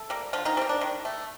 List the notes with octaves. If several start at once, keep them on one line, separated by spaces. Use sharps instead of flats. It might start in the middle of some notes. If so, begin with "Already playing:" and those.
Already playing: A3 A4
G3 A#3
D3 F3 F4
D#3 D#4
G3 A#3 C4
D4
D#3
A3